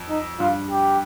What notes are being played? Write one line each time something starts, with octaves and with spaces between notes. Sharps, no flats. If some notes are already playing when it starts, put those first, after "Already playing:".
Already playing: F2
D#4
G2 F4
G4